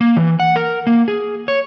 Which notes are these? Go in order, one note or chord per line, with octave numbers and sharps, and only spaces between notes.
A#3
E3
F#5
A#4
A#3
G#4
C#5